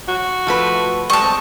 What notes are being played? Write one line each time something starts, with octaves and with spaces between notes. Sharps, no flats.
F#4
F3 A3 B4
G3 G#3 A5 C#6
C4